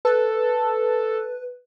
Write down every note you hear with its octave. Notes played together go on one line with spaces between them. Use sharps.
A4 B4